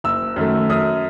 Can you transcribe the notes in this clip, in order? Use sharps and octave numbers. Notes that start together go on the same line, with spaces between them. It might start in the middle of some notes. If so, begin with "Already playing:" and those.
F#1 E6
F#2 D#3 A3
F#2 D#6